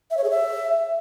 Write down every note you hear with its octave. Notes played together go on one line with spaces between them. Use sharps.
E5
C#5
G#4
E5